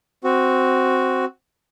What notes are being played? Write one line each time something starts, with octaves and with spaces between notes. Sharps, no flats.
C4 F#4